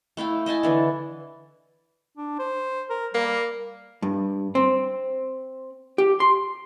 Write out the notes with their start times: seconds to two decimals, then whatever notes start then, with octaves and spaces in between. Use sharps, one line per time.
0.17 A3 E4 F5 G5
0.46 D#5 E5 G#5 A5
0.63 D3 E3
2.17 D4
2.39 C5
2.90 A#4
3.14 G3 A#3
4.02 G2
4.55 C4
5.98 G4
6.20 C6